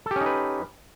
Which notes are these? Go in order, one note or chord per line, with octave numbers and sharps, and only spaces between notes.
C#4 D#4 G4 A4 B4